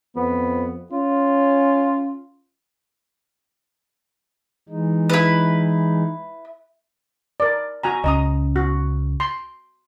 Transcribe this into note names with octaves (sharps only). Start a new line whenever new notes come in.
F2 B3
C#4 F4
E3 G#3 D#4
E4 B4
A#4 D5
F#4 G#5 A#5
C#2 C#4 D#5 A#5 D#6
F#4
C6